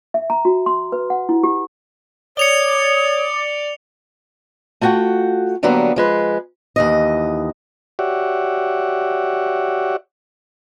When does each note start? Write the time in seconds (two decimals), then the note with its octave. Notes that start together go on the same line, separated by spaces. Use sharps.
0.14 E5
0.30 A#5
0.45 F#4
0.66 C6
0.92 B4
1.10 F#5
1.29 E4
1.43 G4
2.37 C#5 D5 D#6 C#7 F7 G7
4.81 A3 F4 F#4 F#5 G5
5.63 D3 F#3 G3 A#3 B3 B4
5.96 F3 G#3 B4
6.76 D#2 E3 D#5
7.99 F#4 G4 C#5 D5 E5 F#5